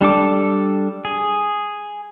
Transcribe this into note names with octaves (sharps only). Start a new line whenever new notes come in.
G3 D4 A4 D6
G#4